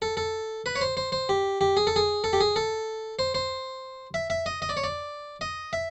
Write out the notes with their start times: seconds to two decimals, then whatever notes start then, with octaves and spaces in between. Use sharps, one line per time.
0.02 A4
0.17 A4
0.66 B4
0.76 C#5
0.81 C5
0.97 C5
1.12 C5
1.29 G4
1.61 G4
1.77 G#4
1.87 A4
1.96 G#4
2.24 A4
2.33 G4
2.40 G#4
2.56 A4
3.19 C5
3.34 C5
4.14 E5
4.30 E5
4.46 D#5
4.62 D#5
4.69 D5
4.77 C#5
4.84 D5
5.41 D#5
5.73 E5